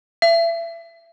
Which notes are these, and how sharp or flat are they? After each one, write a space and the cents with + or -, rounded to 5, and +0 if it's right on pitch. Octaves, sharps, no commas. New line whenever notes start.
E5 +30